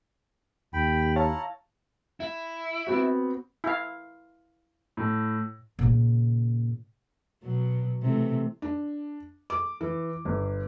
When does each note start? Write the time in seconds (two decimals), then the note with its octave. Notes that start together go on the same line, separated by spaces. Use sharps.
0.73 D#2 G5 B5
1.16 E4 C#5 F5 A5 A#5
2.20 E4
2.87 B3 C4 F#4
3.64 E4 F5
4.97 A2
5.79 A#2 C#3
7.43 B2 F#3
8.02 C3 E3 A3
8.62 D4
9.50 D6
9.81 E3
10.25 G1